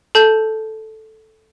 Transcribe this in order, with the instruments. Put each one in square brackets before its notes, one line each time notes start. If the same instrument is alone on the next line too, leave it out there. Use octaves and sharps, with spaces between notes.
[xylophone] A4 A5 G6